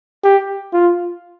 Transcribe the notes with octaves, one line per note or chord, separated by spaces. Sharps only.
G4
F4